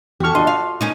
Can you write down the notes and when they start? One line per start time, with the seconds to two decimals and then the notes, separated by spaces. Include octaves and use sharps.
0.20 E2 F#4 G4 A4 C#6 F6
0.35 D4 F4 D#5 C6
0.47 F5
0.81 A#3 C#4 D#4